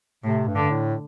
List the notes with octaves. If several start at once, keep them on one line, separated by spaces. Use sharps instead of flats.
A2 C3
G2
D3
A2